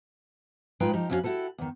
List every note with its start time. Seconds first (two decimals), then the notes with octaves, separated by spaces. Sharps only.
0.80 A2 G#3 D#4 F4 B4 G5
0.93 F3 D#4 G4
1.10 F2 A#3 C#4 F4 F#4 F5
1.23 E4 F#4 G4 A4 B4
1.58 E2 D#3